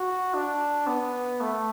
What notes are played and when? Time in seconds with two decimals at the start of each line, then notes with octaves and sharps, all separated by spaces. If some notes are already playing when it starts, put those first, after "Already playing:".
Already playing: F#4
0.34 D4
0.87 B3
1.40 A3